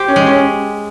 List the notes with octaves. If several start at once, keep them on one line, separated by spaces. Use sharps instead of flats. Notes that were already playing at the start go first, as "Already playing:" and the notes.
Already playing: G4 C5
C#4
G#3
C#4